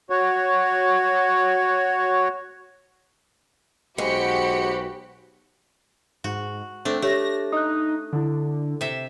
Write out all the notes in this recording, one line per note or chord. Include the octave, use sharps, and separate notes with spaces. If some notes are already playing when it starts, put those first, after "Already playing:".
F#4 C#5
B1 G#3 F#4 G4 C5 B5 C#7
G#2 F#4
A3 C4 D4
A3 G4 C#5 E5 A#6
D#4 D#6 F#6
D3 E4 A4
C3 E5